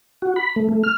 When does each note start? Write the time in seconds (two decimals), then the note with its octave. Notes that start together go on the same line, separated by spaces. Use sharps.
0.22 F#4
0.36 B5
0.56 A3
0.69 A3
0.84 F6